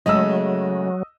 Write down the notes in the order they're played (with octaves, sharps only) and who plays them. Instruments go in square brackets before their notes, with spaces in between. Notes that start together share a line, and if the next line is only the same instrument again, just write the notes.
[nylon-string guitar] C#3 G#3 A3 [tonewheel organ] F#3 [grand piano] D#5 E6